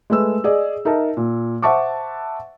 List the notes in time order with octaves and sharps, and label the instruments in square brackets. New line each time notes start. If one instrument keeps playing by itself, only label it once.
[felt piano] G#3 A3 B4 E6
G#4 D5 D#5
D#4 A#4 E5 A5
A#2
C5 E5 F#5 A5 C#6 D6